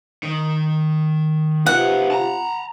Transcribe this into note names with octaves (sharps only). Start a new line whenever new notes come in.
D#3
C3 D#4 F4 B4 F#5
A5 A#5